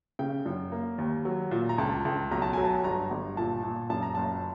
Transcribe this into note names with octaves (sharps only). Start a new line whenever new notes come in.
C#3 G5
F#2
A#3
D#2
F#3
A#2
A#5
C#2 A5
C#2
B1 A#5
A5
F#3 G#5
A5
G1 A#5
G1
A#2 A5
A#2
F#2 A5
A#5
F#1 A5